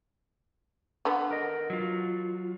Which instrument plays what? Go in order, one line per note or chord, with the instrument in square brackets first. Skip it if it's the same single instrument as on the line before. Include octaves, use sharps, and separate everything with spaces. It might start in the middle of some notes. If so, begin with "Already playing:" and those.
[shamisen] D3 B3
[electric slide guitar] A#4 D#5
F#3 F4